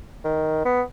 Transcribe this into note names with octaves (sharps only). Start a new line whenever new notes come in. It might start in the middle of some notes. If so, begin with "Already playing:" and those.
D#3
B3